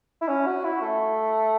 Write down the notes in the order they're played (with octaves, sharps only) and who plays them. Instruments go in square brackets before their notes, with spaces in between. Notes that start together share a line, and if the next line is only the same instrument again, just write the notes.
[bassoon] E4
C#4
F#4
E4
A3